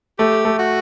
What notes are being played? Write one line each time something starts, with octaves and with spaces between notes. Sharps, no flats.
A3 G4
A3
F#4